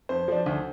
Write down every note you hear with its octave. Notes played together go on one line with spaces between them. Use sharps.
F2 C5
F3 D4
D2